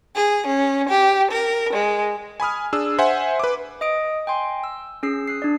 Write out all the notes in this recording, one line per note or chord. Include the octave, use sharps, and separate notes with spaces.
G#4
C#4
G4
A#4
G#3
G#5 B5 D#6 F6
D4 G#4 E6
C5 E5 F#5 G#5 C6
B4 D6
D#5 D#6 D7
G5 G#5 C6
E6
C#4 G#4 E6 C7
D#6 F#6 C7
D4 D5